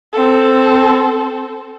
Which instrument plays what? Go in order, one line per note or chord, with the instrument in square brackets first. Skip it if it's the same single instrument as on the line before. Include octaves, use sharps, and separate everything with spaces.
[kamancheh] C4 A4